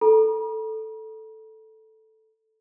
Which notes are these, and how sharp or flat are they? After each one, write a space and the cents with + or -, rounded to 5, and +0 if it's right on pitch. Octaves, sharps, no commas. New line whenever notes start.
A4 +0 A#5 +45